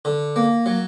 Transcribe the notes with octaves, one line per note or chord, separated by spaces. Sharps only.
D3
A#3
F#3